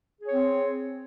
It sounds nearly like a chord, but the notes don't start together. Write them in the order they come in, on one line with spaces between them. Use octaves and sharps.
G#4 C#5 C4